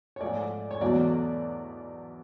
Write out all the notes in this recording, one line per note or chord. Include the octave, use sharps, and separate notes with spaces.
C#5
G#2 F3 A3 D5
C#5
E2 B2 F#3 A3 D5